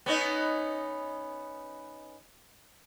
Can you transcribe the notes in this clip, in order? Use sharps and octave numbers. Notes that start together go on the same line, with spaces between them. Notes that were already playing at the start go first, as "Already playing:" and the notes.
B3 C#4 D#4